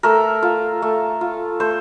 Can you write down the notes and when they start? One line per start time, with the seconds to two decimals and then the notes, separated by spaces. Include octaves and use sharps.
0.03 A3 A#4
0.42 F4
0.82 A3
1.21 F4
1.60 A3 C5